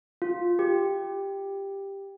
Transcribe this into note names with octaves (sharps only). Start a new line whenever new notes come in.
F4
G4